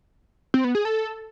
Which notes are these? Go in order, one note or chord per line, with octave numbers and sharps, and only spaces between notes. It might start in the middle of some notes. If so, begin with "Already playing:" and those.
C4
B3
G#4
A4